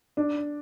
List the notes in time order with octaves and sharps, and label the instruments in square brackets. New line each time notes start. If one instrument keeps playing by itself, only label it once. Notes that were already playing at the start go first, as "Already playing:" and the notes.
[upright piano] D4